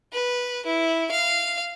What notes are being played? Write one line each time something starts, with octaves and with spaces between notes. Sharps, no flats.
B4
E4
F5